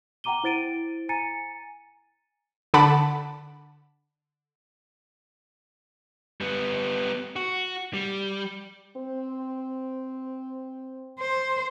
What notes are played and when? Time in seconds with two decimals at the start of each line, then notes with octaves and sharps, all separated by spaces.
0.24 F#5 G5 A#5 D6 D#7 G7
0.44 E4 C5 A6 D7 D#7
1.09 G#5 A#5 A6 C#7 D#7
2.74 D3 F#5 A5 B5 D6
6.41 G3 B3
7.36 F#4
7.94 G3
8.97 C4
11.20 C5